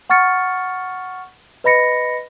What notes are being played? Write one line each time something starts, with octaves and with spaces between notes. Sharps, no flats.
F#5 C#6 F6 A6 C#7
B4 D#5 B5 A#6 C#7